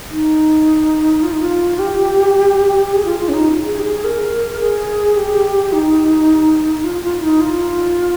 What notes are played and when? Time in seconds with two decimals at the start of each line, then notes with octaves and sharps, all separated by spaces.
0.10 D#4
1.23 F4
1.32 D#4
1.41 F4
1.79 G4
2.91 G#4
3.05 F4
3.19 F4
3.29 C#4
3.33 D#4
3.66 G#4
3.79 G4
3.85 G#4
4.04 A#4
4.60 G#4
5.16 G4
5.72 D#4
6.84 F4
7.03 F4
7.22 D#4
7.41 F4